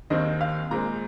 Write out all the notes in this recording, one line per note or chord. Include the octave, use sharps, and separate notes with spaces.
D#2 D#3 C4 D#5
F5
A#2 G#3 C4 A#5